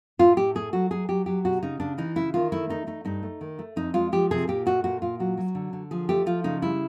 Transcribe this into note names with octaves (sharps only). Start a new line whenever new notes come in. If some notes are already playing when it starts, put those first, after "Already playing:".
A2 F4
A2 G4
A3 G#4
F#3 F#4
F#3 G#4
F#3 G4
F#3 G4
B2 F#4
C#3 D#4
C#3 D4
E3 D#4
C#3 E4
D#3 F4
A3 E4
A3 D#4
A3 D#4
G2 D#4
A3
D#3
A3
F2 D#4
G#3 F4
F3 G4
C3 G#4
A#2 G4
A3 F#4
A#2 F#4
A#2 F4
F#3 F#4
F#3
D3
D3
F3 G#4
A3 G4
F3 F4
C#3 D#4
G3 E4